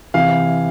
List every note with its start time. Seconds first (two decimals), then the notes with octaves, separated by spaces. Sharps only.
0.14 C3 E3 F5